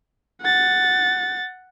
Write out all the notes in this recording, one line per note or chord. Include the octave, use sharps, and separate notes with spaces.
F#5 A6